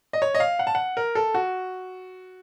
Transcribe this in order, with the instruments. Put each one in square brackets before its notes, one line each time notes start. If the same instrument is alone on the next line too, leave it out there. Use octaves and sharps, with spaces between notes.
[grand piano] D#5
C#5
D#5
F5
F#5
A5
F#5
A#4
A4
F#4